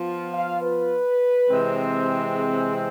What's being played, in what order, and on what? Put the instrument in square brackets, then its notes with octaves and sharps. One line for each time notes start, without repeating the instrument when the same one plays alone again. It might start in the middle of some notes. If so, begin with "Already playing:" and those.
Already playing: [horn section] F3 B3 F4
[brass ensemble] F5
B4
[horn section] C3 E3 G#3 C4
[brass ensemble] G#4